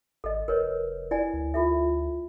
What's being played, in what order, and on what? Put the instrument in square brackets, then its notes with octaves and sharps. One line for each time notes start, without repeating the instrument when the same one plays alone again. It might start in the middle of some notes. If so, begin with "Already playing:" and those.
[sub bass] G#1 [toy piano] A4 D#5
[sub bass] F1 [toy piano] A#4 B4 C#5
[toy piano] E4 D5 G#5
[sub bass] D2
[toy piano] F4 A4 E5